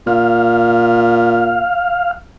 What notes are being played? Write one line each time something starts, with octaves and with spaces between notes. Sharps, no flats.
A#2 F5